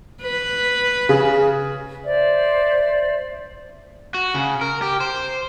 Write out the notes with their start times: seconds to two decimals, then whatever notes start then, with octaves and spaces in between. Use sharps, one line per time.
0.22 B4
1.09 C#3
2.04 C5 D5 E5
4.14 F#4
4.35 C#3
4.61 A#4
4.82 G4
5.00 C5